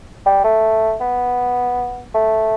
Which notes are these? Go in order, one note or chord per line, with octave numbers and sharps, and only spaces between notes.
G3
A3
B3
A3